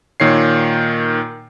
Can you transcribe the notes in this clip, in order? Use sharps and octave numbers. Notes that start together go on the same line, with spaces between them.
A#2 D#3 C#5 C7